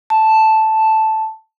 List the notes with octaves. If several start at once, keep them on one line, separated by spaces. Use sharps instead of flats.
A5